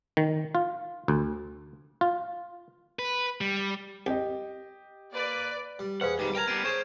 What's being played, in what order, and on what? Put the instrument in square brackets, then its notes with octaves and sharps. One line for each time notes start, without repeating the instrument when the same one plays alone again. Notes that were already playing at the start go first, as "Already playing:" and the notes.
[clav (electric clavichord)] D#3
F4
D2
F4
[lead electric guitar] B4
G3
[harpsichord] C2 [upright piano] G4 D#5
[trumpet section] A#3 B4 [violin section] D5
[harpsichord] G3
[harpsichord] E2 G#4 [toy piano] B4 C5 F5 [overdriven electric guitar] F#5
[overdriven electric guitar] G#2 D#3 [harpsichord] G3 G4
[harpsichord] D4 A#4 [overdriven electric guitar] G5 A#5 [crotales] G#6 A#6 F7
[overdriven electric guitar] G3 B3 [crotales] C7 D7 D#7
[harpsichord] C#4 G#4 [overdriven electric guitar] C5 [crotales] C#6 G#6